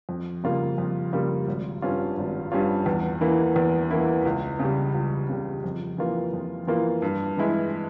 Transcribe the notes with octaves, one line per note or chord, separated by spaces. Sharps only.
F2
C#3 G3 A#3 F4
F2
C#3 G3 A#3 F4
G#1
G2 G3 C#4 F4
G#1
G2 G3 C#4 F4
E2
E3 A#3 E4
E2
E3 A#3 E4
C#2
C#3 G3
C#2
C#3 G3
F2
E3 A#3 F4
F2
E3 A#3 F4
G2
E3 G#3 E4